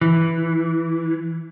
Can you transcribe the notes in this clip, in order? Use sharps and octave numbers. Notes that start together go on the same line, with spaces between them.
E3